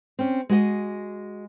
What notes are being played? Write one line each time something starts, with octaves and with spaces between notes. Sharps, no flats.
C4 C#4
G#3 F#4 D#5